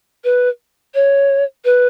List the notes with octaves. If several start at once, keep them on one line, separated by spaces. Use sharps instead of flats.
B4
C#5
B4